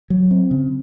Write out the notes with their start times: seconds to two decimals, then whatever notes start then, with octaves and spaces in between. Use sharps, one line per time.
0.10 F#3
0.31 C4
0.51 C#3